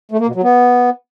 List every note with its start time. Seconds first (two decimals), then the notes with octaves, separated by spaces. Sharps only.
0.11 A3
0.19 A#3
0.27 B2
0.35 F#3
0.43 B3